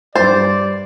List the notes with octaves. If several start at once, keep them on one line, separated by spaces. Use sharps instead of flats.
G2 C5 D5 A6